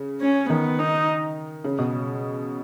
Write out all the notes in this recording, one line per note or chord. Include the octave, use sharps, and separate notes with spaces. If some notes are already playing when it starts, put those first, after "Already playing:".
Already playing: C#3
C#4
D#3 B3
D#4
C#3
B2